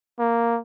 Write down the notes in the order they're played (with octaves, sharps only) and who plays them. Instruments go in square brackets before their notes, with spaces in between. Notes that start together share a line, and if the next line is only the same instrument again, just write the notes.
[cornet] A#3